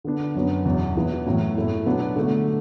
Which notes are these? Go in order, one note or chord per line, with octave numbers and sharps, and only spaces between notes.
D3 B3 D4
F#2 F#3 B3
E2 B2 F#3
E2 E3 B3
A2 F#3 B3
A2 A3 E4
B2 F#3 B3 D4
D3 F#3 A3 D4